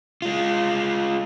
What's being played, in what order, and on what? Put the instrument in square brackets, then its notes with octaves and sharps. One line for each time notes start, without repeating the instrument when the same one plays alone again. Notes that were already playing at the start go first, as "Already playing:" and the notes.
[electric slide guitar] G#3 F4